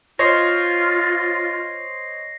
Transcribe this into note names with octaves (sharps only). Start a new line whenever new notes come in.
F4 C5 C#5 D#5 A#6 C7